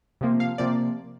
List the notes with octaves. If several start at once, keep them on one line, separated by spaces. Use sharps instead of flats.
C3 F3 A#3
F5
C3 F3 A#3 D5